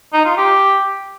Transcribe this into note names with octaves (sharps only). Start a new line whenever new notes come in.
D#4
F4
G4